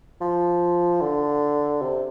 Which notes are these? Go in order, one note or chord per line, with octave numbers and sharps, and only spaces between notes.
F3
D3
C3